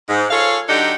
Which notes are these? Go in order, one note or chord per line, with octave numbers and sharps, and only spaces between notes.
G#2
F4 G#4 A4 C#5 F5
D3 F#3 D4 D#4 G4 A4